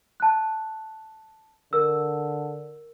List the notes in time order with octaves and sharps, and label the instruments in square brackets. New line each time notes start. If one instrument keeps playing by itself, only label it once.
[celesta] A5 F#6
[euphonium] D3 [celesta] A#4 E6